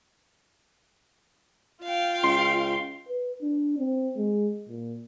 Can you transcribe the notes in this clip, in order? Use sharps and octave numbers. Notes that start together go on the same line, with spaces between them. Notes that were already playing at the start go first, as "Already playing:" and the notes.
F4 F5 G5
C#2 C6
B4
D4
C4
G#3
A#2